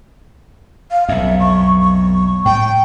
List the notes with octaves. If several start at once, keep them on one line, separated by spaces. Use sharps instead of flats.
F5
B1 F2 E5
C#6
C#6
A2 A3 G5